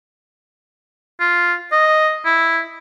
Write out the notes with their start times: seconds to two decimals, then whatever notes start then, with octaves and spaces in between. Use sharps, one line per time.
1.20 F4
1.72 D#5
2.25 E4